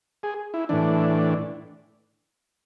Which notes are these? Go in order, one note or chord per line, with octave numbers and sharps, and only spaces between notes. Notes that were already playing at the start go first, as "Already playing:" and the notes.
G#4
E4
A2 E3 D4